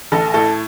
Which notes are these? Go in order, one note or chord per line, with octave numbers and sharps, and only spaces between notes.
A1 A4
A2 A4